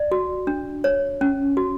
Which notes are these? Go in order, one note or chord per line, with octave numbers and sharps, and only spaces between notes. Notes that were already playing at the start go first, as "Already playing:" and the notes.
Already playing: D5
F#4
D4
C#5
C#4
F#4